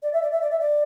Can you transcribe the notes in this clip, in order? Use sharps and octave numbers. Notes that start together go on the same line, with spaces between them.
D5
E5
D5
E5
D5
E5
D5